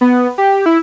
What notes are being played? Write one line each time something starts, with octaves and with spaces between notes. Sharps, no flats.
B3
G4
E4